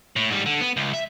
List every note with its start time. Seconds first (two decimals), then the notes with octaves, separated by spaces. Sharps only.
0.16 A2
0.30 G#2 G3
0.46 D3
0.61 B3
0.77 C#2
0.93 E5